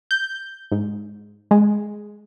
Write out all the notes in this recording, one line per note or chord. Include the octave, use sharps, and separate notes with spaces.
G6
G#2
G#3